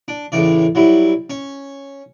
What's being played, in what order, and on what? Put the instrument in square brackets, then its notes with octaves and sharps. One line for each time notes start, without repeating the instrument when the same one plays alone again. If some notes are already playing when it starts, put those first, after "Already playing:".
[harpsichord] D4
C#2 A2 E3 D5
F#3 G3 E4
C#4